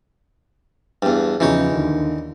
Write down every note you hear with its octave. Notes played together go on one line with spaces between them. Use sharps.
E2 G2
E2 C#3 E3 F3 D#4 C#5
D#2 D3